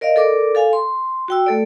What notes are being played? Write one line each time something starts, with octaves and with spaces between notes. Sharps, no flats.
A#4 D5 D#5 F5
A4 A#4 D5 D6
A4 F5 G#5
C6
F#4 G5 E6
A3 A4 D5